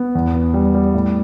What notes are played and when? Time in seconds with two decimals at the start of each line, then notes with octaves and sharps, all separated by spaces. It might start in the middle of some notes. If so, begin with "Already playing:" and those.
Already playing: B3
0.15 E2
0.34 B3
0.54 G3
0.74 G3
0.94 A2